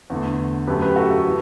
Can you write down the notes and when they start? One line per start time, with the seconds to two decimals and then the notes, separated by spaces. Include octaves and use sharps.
0.10 E2 D3 A3
0.67 F#2 F#3 A3 G4 B4
0.82 G4 B4
0.96 F#4 A4
1.11 F#4 A4
1.25 E3